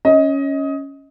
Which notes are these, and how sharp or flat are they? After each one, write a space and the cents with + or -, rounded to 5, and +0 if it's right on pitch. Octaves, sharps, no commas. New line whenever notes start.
C#4 +0 D#5 +20